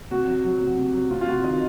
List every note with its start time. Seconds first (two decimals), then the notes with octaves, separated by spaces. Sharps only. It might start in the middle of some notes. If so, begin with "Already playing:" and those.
0.11 C3 F#4
0.27 F#3
0.45 F#3
0.61 C3
0.78 C3
0.94 F#3
1.11 C3 F4
1.21 F4
1.27 C3 F#4
1.44 D#3 D#5